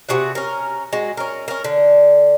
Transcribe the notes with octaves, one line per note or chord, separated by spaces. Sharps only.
C3 F#4 G#4 F#5
C#4 A#4
G#3 F#4
C#4 A#4
C#4 A#4
D3